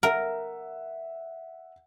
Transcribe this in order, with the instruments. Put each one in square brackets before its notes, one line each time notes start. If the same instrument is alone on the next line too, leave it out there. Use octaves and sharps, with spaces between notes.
[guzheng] A#4 [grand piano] E5 F#5